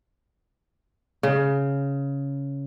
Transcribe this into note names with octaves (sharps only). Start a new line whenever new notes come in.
C#3